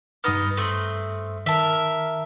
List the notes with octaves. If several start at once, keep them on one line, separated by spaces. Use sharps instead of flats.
G2 B3 D#4 D#6 F6
A3 C4
D#3 A#4 E5 A5